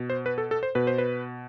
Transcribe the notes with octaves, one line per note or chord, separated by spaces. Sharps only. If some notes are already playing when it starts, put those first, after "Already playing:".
Already playing: B2
C5
B4
A4
A4
C5
B2 B4
C5
B4